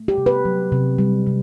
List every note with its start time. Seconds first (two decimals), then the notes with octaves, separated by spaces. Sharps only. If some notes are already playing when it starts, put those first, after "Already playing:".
Already playing: A3
0.08 G4
0.18 C3
0.26 B4
0.45 F#3
0.72 C3
0.98 G3
1.27 C3